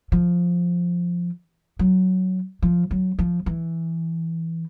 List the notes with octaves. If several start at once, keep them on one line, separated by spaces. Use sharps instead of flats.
F3
F#3
F3
F#3
F3
E3